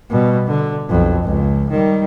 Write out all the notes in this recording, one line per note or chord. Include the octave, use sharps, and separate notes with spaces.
B2 G3
D3
B1 F2
C#2
D#3 G3